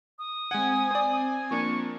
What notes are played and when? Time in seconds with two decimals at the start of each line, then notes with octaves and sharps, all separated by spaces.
0.19 D#6
0.51 G#3 C4 F#5 G#5
0.91 C5 D5
1.51 F3 A#3 D4 C#6